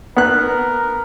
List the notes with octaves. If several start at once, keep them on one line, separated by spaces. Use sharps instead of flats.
B3 A#4 F#6